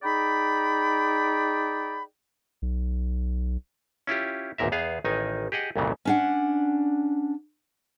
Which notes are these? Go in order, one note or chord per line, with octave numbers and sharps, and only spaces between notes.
D#4 G#4 D5 G5 B5
B1
C#4 E4 F4 G4
G#1 E2 A#2 A#4 E5
E2 B3 G#4 F5
A1 D#3 D#4 G#5
G4 G#4 D#5 F#5
C2 F2 A#2 C#3 E3
C#4 D4 F#5